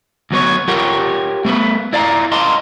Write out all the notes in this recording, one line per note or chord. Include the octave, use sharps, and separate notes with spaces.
D2 F#3 B3 C#5
F4 G4 A#4 C#5 F#5 G5
A3 B3 B4
E4 D5 F5 A5 A#5
D#5 F5 A5 A#5 C6